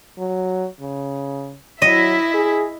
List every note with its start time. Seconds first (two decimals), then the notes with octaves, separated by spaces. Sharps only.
0.18 F#3
0.80 C#3
1.82 F#3 E4 D#5 E5
2.35 G#4